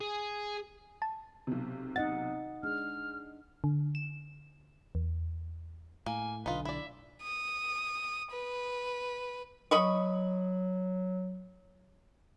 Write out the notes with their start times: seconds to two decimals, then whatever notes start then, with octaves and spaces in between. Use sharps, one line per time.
0.01 G#4
1.02 A5
1.47 B1 C3
1.96 D#4 D#5 F#5 A6
2.63 G#3 D4 F6
3.64 D3
3.95 E7
4.95 E2
6.06 A2 A#3 G#5
6.46 B1 D3 D#4 F4 B4
6.65 E4 D5 E5
7.22 D#6
8.31 B4
9.71 F#3 D#5 B5 C#6